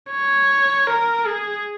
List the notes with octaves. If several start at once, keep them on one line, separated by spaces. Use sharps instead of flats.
C#5
A#4
G#4